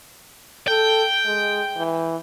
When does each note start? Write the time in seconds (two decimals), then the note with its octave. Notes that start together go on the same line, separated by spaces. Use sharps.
0.68 A4 G5
1.25 G#3
1.77 E3